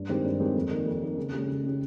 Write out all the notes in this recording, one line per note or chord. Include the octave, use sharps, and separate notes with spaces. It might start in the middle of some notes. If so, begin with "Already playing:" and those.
Already playing: G2
D#3 G#3 C4 G4
G2
D#3 G#3 C4 G4
F2
D#3 A#3
F2
D#3 A#3
C#3
G#3 C#4 G4
C#3
G#3 C#4 G4